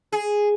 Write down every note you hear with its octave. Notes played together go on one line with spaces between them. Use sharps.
G#4